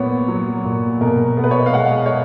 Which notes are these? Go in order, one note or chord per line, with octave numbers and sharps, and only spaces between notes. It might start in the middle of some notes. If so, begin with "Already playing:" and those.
Already playing: A#2 B3 C#5
F#3
A#2
B2 A#4
B3
B4
C#5
D#5
F5
G#3 F#5
C#5